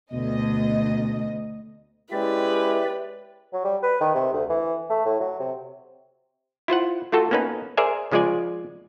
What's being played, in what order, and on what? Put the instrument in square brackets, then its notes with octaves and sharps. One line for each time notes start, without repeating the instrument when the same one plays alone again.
[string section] D2 D#5 [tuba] B2
[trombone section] G#3 C#4 E4 [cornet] G4 [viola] B4 [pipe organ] D5 E5
[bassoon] F#3
G3
B4
D#3
C3
D2
E3
A3
A2
F#3
C3
[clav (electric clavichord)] E4 F4 C5 F#5
A3 F4 F#4 A4
A#3 B3 C#4 D#4 B4
G#4 A#4 C5 D5 E5 G#5
C#3 F3 G#3 F4 D5 G#5